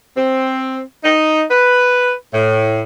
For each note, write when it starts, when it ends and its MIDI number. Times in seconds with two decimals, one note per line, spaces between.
0.17 0.80 60
1.04 1.43 63
1.50 2.13 71
2.33 2.81 45